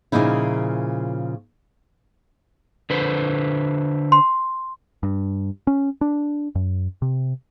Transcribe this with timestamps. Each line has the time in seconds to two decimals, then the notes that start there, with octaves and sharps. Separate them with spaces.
0.12 A#2 C#3 F3 A#3 D#4 E4
2.90 D3 B4 C5
4.12 C6
5.03 G2
5.67 C#4
6.01 D4
6.55 F#2
7.02 C3